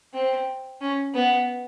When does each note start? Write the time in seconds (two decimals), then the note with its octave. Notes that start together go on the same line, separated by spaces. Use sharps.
0.14 C4
0.81 C#4
1.14 B3